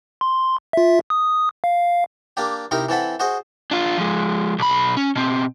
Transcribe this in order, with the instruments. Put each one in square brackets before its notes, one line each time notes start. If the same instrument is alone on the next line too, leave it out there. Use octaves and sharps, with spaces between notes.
[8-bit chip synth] C6
F4 E5
D#6
F5
[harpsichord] A#3 D4 G4
C3 C4 D#4 E4 A#4
E3 C4 A4 F#5 B5
F#4 G#4 C5 D#5
[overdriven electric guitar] D4 F4
F3 G#3
B1 B5
C#4
B2 C4